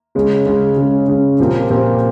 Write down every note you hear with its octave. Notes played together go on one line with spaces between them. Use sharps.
C#3 G#3 C#4
C#3 G#3 C#4
C#3 G#3 C#4
C#3 G#3 C#4
A#2 F3 C4 G4 A#4
A#2 F3 C4 G4 A#4